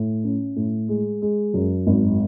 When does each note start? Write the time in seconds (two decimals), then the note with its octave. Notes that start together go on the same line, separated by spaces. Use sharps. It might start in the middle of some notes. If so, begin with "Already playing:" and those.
Already playing: A2
0.24 C#4
0.56 A2
0.89 G#3
1.22 G#3
1.54 F#2
1.87 G#1